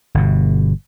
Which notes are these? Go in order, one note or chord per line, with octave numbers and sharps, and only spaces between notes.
G1 B2